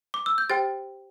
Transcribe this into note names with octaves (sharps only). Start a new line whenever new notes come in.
D6
E6
G6
G4 C5 G5 A6